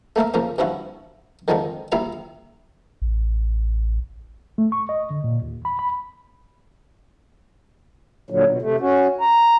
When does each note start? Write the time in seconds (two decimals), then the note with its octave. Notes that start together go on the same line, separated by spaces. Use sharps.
0.16 A3 A#3 A#4 E5
0.34 C#3 F3 A#3 C#4
0.58 G2 F3 C#4 E4 F#4
1.48 D3 D#3 F3 G#3 C4 D4
1.92 A#1 G3 E4 E5 F5 A#5
3.02 A1
4.58 A3
4.72 C#6
4.89 D#5
5.10 D3
5.24 A#2
5.42 D#2
5.65 B5
5.79 B5
8.30 A#2 D3 F#3
8.46 B2
8.62 C3 A3
8.80 C#4 F#4
9.21 A#5